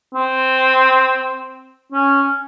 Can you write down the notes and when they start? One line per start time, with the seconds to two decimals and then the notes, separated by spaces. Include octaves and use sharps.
0.15 C4
1.92 C#4